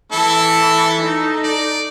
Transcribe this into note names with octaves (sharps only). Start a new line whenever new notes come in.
E3 E4 A4
D#4 A4
D5